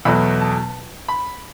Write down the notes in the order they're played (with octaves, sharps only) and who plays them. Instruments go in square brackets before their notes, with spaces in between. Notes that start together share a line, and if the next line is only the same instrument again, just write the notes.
[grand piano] E2 B2 F#3 A3 B5
A5
B5